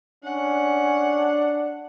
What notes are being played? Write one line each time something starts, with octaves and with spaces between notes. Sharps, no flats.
C#4 D4 F#5